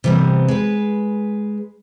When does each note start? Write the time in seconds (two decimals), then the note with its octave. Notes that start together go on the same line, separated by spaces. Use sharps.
0.04 C3 E3 G3 B3 C4
0.48 G#3 B4